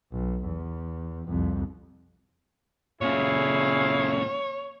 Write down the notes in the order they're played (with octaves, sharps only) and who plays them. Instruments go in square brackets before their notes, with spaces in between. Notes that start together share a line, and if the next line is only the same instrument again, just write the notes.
[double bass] B1
E2
C2 F2
[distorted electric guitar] A#2 C#3 [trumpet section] E4 G#4 F5 [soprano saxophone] C#5